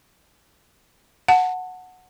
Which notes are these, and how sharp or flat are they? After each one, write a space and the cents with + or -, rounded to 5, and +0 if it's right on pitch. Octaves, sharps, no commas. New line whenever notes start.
F#5 -10 A5 +20